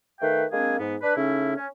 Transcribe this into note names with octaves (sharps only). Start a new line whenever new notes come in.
D#3 A3 B4 F5 G5
G#3 A#3 C4 D4 G#4
G#2 B3
D4 B4
C#3 A3 C#4 D#4 E4
C#4